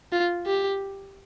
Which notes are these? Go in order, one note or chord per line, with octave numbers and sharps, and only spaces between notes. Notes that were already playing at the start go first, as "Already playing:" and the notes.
F4
G4